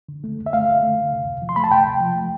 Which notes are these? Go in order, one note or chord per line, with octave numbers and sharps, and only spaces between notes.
D3
A3
D3
E5
A3 F5
D3
A3
D3
C3
C3
F3
C6
A3 B5
A5
C3 G5
C3
F3
A3